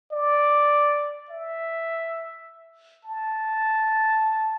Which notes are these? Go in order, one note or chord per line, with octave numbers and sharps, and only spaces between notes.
D5
E5
A5